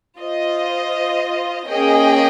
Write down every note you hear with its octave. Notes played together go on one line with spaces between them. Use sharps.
F4 C5 D#5
A#3 C#4 G#4 D#5 G5